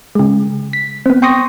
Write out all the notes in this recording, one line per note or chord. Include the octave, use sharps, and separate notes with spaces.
C#3 G#3
B6
B3 C4
G5 C6 C#6 D#6 A#6